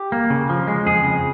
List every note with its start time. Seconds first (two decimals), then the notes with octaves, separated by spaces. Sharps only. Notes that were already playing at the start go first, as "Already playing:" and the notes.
Already playing: G4
0.12 A#3
0.30 C#3
0.49 F3
0.67 G#3
0.87 F2 G#4
1.05 C#3